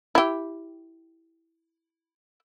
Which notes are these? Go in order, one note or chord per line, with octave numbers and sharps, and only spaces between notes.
E4 G4